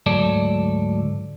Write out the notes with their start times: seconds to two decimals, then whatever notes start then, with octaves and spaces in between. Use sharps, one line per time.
0.06 D2 G#2 F#3 A4 D5